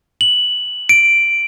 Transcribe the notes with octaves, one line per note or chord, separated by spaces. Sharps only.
F#7
D7